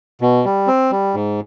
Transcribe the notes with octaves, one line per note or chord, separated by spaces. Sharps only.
B2
G3
C4
G3
G#2